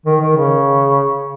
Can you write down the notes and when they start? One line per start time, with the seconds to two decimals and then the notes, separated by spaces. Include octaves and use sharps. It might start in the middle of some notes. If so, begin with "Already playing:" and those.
0.06 D#3
0.21 D#3
0.37 C#3